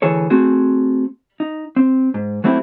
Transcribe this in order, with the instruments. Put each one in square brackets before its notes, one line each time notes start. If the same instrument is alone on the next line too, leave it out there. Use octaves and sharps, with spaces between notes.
[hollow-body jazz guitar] D2 E3 G#4 A4 C#5
A3 C4 F#4 G#4
D#4
C4
G#2
F#3 A3 C4 E4 G4